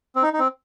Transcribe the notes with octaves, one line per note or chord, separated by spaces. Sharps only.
C4
D#4
D#4
C4